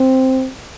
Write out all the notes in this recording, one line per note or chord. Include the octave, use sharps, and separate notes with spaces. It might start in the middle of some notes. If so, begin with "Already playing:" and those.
Already playing: C4